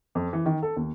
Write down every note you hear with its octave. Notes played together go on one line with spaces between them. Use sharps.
F2
E3
D#3
A4
D#2